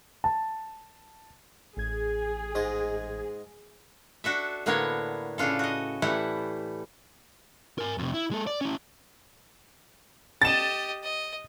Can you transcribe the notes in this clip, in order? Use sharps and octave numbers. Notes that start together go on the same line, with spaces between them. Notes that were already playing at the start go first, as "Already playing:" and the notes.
A5
A1 G#4 G#6
G#2 G#3 D#6
D4 F#4 A4 E5
A2 D3 A#3 B3 D4 C#5
A2 C#3 D4 F4 A4
F#4 D#5
A2 E3 G3 A3 E4 F#5
A#4 G#5
F2 C3
E4
G#3 A4
D5
C#4 E4
G4 D#5 A6 E7
D#5